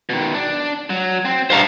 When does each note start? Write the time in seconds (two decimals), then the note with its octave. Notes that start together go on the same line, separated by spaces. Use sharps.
0.10 B2 D#3
0.34 D4
0.90 F#3
1.25 C4
1.50 G2 D4 C5 F5 A#5